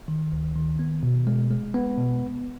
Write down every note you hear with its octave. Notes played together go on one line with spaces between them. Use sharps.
D#3
D2
D#3
B3
B2
G#3
G#3
B3
B2